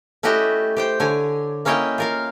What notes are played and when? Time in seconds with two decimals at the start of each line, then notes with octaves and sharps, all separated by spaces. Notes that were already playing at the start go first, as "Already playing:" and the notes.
0.23 A3 C#4 E4 F#4 G4 D#5
0.76 G4 C5 G5
1.00 D3 C#5 G#5
1.65 A#3 C#4 E4 C#5 D#5 G5
1.98 F4 A#4 F5